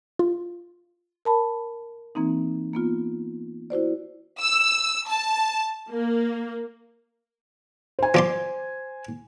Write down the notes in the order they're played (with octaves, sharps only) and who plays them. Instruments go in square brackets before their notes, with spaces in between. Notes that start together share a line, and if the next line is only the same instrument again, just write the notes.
[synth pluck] F4
[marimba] A#4 A5 B5
E3 A#3 C4 D#4
A#3 B3 F4
E4 F#4 C5 D5
[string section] E6
A5
A#3
[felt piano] C5 G#5
[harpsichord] F3 D5 C6